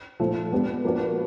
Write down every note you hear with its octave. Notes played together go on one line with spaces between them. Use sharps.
A#2 F3 A3
G#3 B3 D4 G4
F3 A#3 D4 F#4 B4